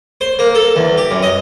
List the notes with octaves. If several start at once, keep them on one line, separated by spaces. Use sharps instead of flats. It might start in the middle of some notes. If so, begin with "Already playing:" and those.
C5
A#3
A4
E2
G4
F#2
D#5